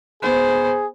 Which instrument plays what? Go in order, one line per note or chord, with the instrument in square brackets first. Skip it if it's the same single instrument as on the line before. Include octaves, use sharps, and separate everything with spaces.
[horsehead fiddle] B3 C5 [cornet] G#4